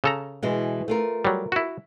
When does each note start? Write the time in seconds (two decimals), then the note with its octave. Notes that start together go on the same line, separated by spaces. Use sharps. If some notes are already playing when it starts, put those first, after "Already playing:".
0.04 C#3 A4 A#5
0.43 B2 E3 G#3
0.88 A3 F4 A#4
1.25 F#3 G3
1.52 E4 F#4